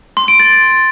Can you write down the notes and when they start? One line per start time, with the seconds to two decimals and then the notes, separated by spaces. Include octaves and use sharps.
0.17 C6
0.28 D7
0.40 A6